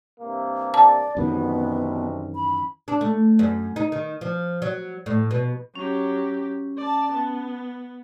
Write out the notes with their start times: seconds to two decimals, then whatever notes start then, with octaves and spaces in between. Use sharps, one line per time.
0.20 G2 C3 A#3
0.74 D5 A5
1.17 C2 F#2 B2 D#3 E3 B3
2.35 B5
2.88 D4
3.01 A3
3.39 F#2
3.76 D#4
3.92 D#3
4.21 F3
4.62 F#3
5.06 A2
5.31 B2
5.76 F#3 C#4 G4
6.78 D5 A5
7.13 B3